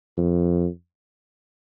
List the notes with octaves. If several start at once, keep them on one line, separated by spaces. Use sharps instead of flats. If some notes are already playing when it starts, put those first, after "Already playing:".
F2